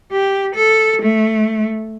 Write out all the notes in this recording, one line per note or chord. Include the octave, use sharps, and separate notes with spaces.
G4
A4
A3